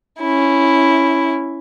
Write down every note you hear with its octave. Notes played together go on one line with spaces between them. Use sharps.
C#4 E4